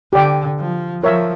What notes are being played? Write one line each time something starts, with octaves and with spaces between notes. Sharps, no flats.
D3 G4 D5 G5
F3
F3 A#4 C#5 E5